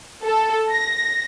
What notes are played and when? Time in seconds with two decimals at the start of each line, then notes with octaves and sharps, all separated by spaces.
0.24 A4
0.73 A#6